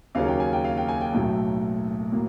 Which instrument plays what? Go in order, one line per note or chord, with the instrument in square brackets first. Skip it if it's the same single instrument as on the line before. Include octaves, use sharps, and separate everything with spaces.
[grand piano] D#2 C#3 F#3 A#3 C#4 F5
G5
G#5
G5
F5
G5
G#5
G5
B1 A2 F#3 A3 G5
A2 F#3 A#3